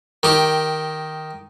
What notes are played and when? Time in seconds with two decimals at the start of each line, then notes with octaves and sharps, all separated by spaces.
0.23 D#3 G4